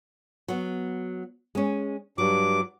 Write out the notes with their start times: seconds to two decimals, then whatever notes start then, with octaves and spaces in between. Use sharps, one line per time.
0.48 F#3 B3
1.55 G#3 C#4
2.18 G2 F#3 D6